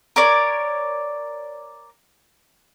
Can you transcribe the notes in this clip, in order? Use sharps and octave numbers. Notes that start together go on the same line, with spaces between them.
A#4 C#5 D5